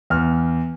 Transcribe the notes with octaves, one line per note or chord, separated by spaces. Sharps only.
E2 F6